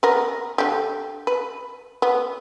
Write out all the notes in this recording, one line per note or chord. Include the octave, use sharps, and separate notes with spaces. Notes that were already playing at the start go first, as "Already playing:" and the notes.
B3 A#4
D3 G4
B4
B3